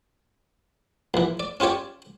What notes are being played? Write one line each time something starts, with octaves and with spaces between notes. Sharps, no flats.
A#1 E3
D5
C#4 F4 G4 C#5 D5